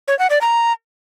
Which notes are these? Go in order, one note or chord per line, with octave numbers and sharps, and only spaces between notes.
C#5
F#5
D5
A#5